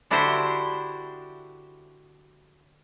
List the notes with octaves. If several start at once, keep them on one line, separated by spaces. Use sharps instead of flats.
D3 D4 E4 F#4 G4 C5